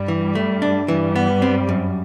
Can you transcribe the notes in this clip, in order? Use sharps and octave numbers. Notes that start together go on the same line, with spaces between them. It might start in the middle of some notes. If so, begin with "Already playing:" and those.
Already playing: G2 G3
E3
A3
D4
G2 E3 G3
B3
C4
F#2